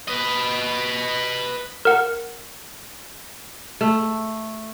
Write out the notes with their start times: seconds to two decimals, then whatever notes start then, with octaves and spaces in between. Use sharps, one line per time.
0.08 B4 D#5
1.85 A#4 F#5
3.81 A3